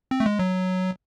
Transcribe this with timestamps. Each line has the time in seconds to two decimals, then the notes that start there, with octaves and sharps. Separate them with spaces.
0.11 C4
0.20 A3
0.26 G#3
0.39 F#3